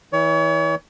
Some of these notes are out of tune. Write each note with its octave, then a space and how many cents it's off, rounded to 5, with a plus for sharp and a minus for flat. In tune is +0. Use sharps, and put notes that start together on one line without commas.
E3 -30 C#5 +35